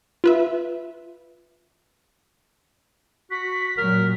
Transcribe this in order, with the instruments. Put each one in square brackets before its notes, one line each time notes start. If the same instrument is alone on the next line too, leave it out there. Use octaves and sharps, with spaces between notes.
[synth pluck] F4 B4 E5
[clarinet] F#4 [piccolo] B6
[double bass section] A#2 F#3 [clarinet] A#4 [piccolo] B6